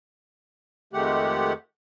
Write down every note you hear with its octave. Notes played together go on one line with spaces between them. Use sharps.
F2 D#3 G#3 A3 G4 F#5